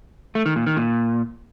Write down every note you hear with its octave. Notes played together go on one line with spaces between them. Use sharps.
A3
D#3
A#2
D#3
A#2